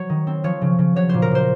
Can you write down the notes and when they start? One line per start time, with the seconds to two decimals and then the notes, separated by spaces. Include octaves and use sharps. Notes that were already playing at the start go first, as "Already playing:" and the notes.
Already playing: F#3 C#5
0.10 D#3
0.27 C4
0.44 F3 C#5
0.62 C#3
0.79 C#3
0.96 F#3 C#5
1.09 A#2 C5
1.22 A#4
1.31 A#2 C5